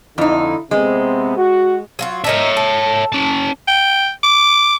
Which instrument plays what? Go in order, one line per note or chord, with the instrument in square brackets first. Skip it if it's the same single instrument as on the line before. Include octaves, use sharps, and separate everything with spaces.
[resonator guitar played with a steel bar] F2 D#4 [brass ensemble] D3 E4
[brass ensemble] C3 B3 C4 [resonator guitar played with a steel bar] G#3
[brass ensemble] F#4
[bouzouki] F#3 F4 F#4
[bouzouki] D4 D#4 A#4 [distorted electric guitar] C#5 E5
[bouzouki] A4
[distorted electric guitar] C#4 A5
[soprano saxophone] G5
D6